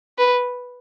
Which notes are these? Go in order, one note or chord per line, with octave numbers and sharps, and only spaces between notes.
B4